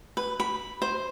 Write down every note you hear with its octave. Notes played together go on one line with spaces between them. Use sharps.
B4
B5
C5